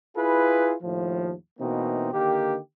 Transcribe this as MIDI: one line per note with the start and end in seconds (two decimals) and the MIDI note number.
0.17 0.73 64
0.17 0.73 65
0.17 0.73 68
0.17 0.73 71
0.83 1.33 39
0.83 1.33 45
0.83 1.33 53
1.59 2.09 47
1.59 2.09 52
1.59 2.09 58
1.59 2.09 60
1.59 2.09 63
2.12 2.57 50
2.12 2.57 51
2.12 2.57 58
2.12 2.57 67